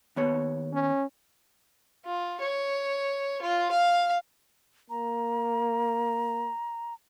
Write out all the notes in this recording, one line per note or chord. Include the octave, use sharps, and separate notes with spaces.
D#2 B3 C#5
C#4
F4
C#5
F4
F5
A#3 A#5